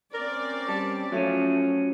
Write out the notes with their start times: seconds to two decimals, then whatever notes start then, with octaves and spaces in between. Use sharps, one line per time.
0.14 C4 C#4 A#4 D5
0.69 G3 A5
1.12 F3 F#3 A3 C#4